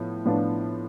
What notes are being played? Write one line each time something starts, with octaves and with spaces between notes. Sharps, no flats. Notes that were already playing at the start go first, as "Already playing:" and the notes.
Already playing: A2 F3 B3
A2 F3 B3 D4 F4